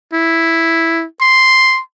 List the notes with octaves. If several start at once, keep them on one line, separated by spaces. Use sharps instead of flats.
E4
C6